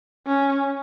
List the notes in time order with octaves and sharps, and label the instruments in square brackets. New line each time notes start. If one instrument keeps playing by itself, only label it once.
[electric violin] C#4